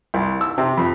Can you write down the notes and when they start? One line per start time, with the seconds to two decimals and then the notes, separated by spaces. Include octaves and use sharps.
0.14 C2
0.41 E6
0.58 C3
0.77 F2